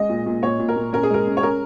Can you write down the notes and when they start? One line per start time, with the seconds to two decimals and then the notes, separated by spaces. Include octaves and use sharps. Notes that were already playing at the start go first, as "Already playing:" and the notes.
Already playing: G#3 D#5
0.09 A#2
0.26 A#2
0.43 A#2 C#5
0.59 A#2
0.69 A#4
0.77 A#2
0.93 C#4 A#4
1.03 G#4
1.10 G#3 A#4
1.27 C#4
1.37 C#5
1.43 C#4 A#4